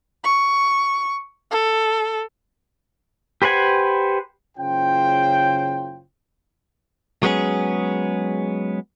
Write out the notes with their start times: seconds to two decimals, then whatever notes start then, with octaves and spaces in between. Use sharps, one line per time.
0.24 C#6
1.51 A4
3.42 G4 B4 C5 F#5 G#5
4.58 F#1 C#3 C#4 F4 C5 G5
7.23 F#3 G#3 B3 C#4 G#4